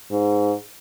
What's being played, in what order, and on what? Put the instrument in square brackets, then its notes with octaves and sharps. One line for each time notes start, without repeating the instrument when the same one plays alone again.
[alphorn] G#2